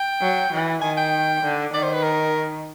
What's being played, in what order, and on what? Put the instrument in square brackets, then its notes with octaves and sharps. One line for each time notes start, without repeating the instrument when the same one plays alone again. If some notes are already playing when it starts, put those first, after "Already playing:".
Already playing: [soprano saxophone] G5
[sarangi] F#3
E3
[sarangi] D#3 [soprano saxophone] G#5
[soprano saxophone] G5
[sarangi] D3
[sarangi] D#3 [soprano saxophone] D5
[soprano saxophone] C5
B4
A#4